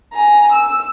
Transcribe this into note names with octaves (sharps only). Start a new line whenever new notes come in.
G#5 A#5
E6